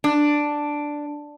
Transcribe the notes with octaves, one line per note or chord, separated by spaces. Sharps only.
D4